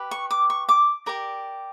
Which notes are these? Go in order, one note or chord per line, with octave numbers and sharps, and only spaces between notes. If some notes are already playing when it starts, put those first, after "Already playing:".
Already playing: G4 B4
C#6
D6
C#6
D6
G4 A#4 D5